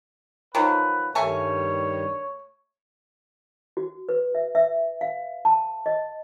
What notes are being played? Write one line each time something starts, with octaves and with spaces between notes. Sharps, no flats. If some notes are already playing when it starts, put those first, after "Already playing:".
D#3 F3 F#3 B4
G2 D#3 G3 A3 C#5 G#5 C#6
F#4
B4
E5
E5
F5
A5
D#5